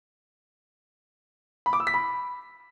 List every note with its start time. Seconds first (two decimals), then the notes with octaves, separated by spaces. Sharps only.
1.66 B5
1.73 D6
1.80 E6
1.87 B6
1.94 B5